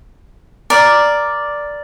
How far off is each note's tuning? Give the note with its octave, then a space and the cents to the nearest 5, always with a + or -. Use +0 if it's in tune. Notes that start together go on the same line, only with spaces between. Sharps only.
A#4 +0 D5 +0